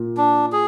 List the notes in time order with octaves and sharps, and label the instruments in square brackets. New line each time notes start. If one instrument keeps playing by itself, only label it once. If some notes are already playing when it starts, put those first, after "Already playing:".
Already playing: [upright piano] A#2
[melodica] D4
G#4